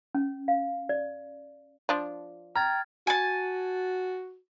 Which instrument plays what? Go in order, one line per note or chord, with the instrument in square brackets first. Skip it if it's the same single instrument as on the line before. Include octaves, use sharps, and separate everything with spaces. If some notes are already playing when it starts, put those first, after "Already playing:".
[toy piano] C#4
F5
D5
[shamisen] F3 D4 F4
[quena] G5 [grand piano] A#5 [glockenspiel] F6 G#6 A6
[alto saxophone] F#4 [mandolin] G#5 A5